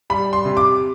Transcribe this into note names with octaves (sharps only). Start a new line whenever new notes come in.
G3 B5
C6
C3
D6